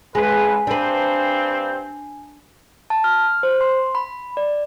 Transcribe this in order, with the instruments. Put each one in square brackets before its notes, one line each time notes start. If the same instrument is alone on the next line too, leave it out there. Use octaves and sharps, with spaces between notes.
[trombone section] A1 B4 [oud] G#3 [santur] G#5 B5
[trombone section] G2 C4 C5 [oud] D4 B4
[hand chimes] A5
F6
C5
C6
B5
D5